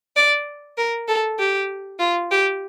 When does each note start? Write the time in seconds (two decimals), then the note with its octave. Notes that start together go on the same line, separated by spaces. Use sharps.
0.16 D5
0.78 A#4
1.08 A4
1.39 G4
2.00 F4
2.31 G4